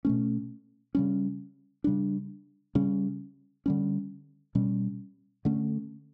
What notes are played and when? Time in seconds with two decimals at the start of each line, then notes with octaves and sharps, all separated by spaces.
0.05 B2 A3 C#4
0.95 C#3 G3 C#4
1.84 C#3 G3 D4
2.75 C#3 G3 C#4
3.66 D3 G3 C#4
4.55 B2 G3 C#4
5.45 D3 A3 C#4